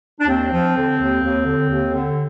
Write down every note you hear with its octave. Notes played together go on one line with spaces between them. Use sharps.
D4
D#2 C4
F3
D3
D#2
D#2
D3
D#2
D3